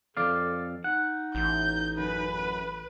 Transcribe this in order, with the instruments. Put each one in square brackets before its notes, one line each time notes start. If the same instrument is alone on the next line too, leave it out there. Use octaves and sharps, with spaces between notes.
[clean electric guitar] F2 D5 F5 [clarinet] A4
[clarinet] D#4 [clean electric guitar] F#5
[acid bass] A1 [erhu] G6
[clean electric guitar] F#2 [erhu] B4